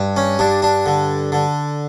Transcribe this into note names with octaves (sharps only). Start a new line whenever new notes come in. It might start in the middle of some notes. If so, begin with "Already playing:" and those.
Already playing: G2
C#4
G2 D4
D4
D3
D3